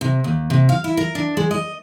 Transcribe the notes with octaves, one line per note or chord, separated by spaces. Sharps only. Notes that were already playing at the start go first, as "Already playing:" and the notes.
C3
D#2
C3
F5
E4
A#4
D4
G#3
D#5